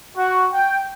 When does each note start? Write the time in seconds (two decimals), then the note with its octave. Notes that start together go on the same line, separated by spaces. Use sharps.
0.16 F#4
0.51 G5